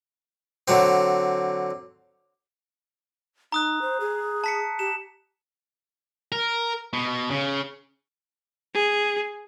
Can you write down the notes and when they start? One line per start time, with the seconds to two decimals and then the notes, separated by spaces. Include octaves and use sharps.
0.68 D3 F#3 C4
3.52 D#4 A#5 D#6 F#6
3.82 C5
4.00 G#4
4.44 A5 B6 C#7
4.79 G4 E7
6.32 A#4
6.93 B2
7.31 C#3
8.74 G#4